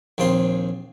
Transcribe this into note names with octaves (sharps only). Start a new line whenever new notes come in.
A#1 D#2 C4 F4 C6